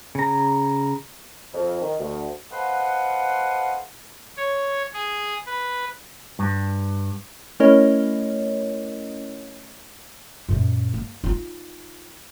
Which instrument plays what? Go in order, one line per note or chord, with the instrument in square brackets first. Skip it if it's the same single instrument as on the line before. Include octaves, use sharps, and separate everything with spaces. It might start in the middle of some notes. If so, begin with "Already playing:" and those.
[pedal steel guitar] C#3 A#5
[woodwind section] F2
D#3
D2
[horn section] A4 B4 C5 D#5 F5 F#5
[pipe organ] C#5
G#4
B4
[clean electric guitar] G2
[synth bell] A3 C#4 E4 A#4 C#5 D#5
[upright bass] F#2 A#2
A#3
D#4 F4